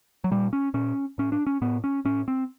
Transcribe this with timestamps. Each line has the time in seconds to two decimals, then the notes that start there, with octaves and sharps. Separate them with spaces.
0.24 F#3
0.31 A#2 G3
0.53 C#4
0.74 A#2 C#4
1.18 A2 C#4
1.32 D4
1.47 C#4
1.61 A2 B3
1.84 C#4
2.05 A2 C#4
2.28 C4